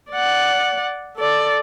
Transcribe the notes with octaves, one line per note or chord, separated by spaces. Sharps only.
D5 F#5
A4 D5